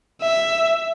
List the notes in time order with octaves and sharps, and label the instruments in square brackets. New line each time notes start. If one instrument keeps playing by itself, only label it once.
[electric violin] E5